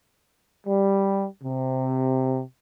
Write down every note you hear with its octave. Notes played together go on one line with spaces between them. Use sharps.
G3
C3